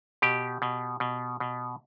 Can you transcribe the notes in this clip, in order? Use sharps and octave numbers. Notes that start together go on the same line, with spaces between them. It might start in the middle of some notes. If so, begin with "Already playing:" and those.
B2 G4
B2
B2
B2